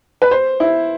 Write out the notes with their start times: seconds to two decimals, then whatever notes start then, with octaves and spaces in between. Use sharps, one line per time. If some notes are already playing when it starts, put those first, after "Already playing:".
0.22 B4
0.31 C5
0.60 E4